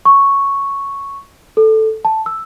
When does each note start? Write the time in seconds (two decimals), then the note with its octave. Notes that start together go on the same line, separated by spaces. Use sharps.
0.05 C#6
1.57 A4
2.05 A5
2.26 E6